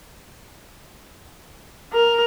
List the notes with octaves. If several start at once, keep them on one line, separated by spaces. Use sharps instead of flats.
A#4